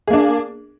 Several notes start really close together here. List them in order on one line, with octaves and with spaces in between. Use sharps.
G#4 A#3 D4